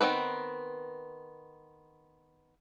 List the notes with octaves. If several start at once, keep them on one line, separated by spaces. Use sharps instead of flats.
D#3 B3 C4 B4